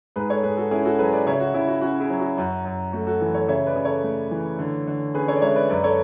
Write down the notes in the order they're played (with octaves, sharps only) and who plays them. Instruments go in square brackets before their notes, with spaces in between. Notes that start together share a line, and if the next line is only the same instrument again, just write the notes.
[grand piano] G#2 G#4 B4
A4 C#5
G#2 G#4 B4
F#4 A4
C#4 E4 G#4
F#4 A4
F#3 G#4 B4
B4 D5
C#3 C#5 E5
F#4
C#3 E4
F#4
C#4 F#4
E4 G#4
F#3
F#4
F#2 F#4
F#2
A3 F#4
F#4 A4
E3
A4 C#5
C#3 C#5 E5
B4 D5
C#3
A4 C#5
A3
E3
D3
D3
C#4 G#4 B4
A4 C#5
D5
G#3 C#5 E5
B4 D5
F#2 B4 D5
A4 C#5